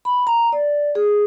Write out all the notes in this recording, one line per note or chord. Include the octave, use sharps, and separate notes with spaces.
B5
A#5
D5
G#4